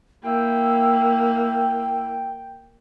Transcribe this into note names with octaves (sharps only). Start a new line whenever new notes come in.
A#3 E4 G5